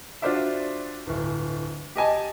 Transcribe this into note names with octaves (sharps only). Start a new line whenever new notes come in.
D4 F4 F#4 C5 D5 E5
D1 G1
G4 D#5 G#5 A5